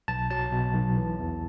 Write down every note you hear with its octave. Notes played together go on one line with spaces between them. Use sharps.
B1 A5
F#3 A5
B2
B1
E3
E2